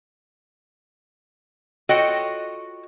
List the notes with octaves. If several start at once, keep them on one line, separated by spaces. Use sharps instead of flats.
F4 F#4 A4 C#5 D#5 G5